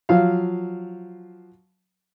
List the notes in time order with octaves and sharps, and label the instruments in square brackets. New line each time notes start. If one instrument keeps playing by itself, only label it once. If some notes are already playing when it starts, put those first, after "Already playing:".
[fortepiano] F3 F#3 F5